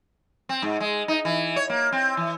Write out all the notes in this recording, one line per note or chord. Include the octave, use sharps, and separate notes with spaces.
C4
G#2
G#3
D#4
E3
C#5
A#3
C4
E3